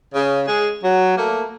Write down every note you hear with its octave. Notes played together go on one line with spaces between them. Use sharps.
C#3
G#3 G#4
F#3
A3 A#3